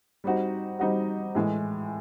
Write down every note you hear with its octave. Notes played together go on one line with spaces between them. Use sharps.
G3 C4 D#4 F#4
G3 C4 D#4 F#4
A2 E3 G#3